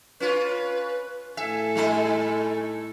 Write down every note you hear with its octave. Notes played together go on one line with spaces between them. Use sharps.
C#4 F4 B4
A2 E4 A4 E5 G#5
G3 A3 D#4